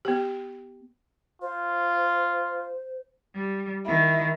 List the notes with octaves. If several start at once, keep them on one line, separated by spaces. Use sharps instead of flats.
B3 G4
F4 C5
G3
D#3 E4